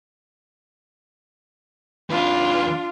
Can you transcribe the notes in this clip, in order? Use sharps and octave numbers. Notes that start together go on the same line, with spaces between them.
D#2 D4 F4 B4